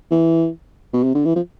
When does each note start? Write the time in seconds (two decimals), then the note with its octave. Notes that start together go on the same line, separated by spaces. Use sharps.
0.11 E3
0.94 B2
1.04 C3
1.15 D3
1.25 E3
1.36 F3